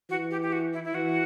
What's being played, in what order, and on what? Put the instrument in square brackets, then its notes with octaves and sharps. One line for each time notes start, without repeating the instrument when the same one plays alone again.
[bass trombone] E3 [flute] F#4
[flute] G4
G4
F#4
E4
E4
[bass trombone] E3 [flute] F#4